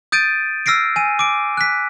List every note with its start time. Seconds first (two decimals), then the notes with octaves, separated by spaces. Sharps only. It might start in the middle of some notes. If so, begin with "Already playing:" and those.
0.12 D#6 G6 A6 D7 D#7
0.66 E6 F6 A#6 C7 D7
0.96 G#5 D#7
1.19 D6 D7
1.57 F#6 B6